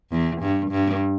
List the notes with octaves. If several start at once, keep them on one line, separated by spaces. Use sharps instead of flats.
E2
G2
G2